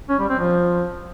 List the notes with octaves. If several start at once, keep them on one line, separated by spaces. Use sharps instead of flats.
C#4
G3
C4
F3